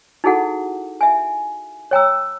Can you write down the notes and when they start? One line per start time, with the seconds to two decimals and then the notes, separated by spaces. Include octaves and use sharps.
0.24 D#4 E4 F#4 G#4 A4 F#5
1.01 E5 G#5
1.91 C#5 G5 A#5 E6